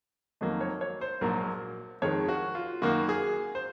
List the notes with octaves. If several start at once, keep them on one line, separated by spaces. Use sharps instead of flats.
F2 D#3 F#3 A#3 D#5
C#5
C#5
C5
A#1 G#2 F#3 A#3 A#4
F2 D#3 G#3 C#5
F#4
F4
F#2 D#3 A#3 F#4
G#4
C5